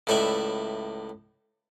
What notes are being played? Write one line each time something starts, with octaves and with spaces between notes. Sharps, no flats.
C#2 A2 A4 B4 D5 E5